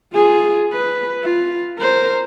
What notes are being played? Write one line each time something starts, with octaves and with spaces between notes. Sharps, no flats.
F4 G#4
B4
F4
A#4 C5